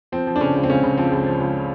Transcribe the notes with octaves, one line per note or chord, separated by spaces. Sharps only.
F3 C4
F3
D4
C#3 C#4
C#2
C4
C#2 C#4
C#3
F3 C4
C#2
F3
C#2